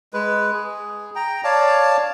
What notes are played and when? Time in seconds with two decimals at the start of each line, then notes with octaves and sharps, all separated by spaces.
0.13 G#3 B4
0.54 G#4
1.15 G5 A#5
1.44 C#5 D5 F5 A5